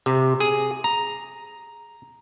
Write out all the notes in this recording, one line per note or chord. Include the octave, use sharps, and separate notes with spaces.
C3
G#4
A#5